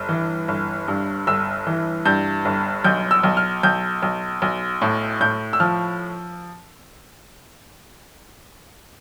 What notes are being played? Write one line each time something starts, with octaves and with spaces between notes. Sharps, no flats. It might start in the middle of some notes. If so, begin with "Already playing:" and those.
Already playing: G1
E3
G1
G2
G1 E6
E3
G2 G6
G1
B1 G6
E6
B1
F6
B1 G6
B1
B1
A2
A2 G6
E6
F3 F6